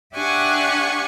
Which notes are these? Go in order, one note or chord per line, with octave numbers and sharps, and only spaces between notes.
D4 G4 E5 F#5 G#5 C#6